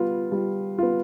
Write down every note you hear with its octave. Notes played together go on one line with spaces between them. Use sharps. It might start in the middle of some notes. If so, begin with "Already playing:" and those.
Already playing: G3 B3 F4
G3
B3 F4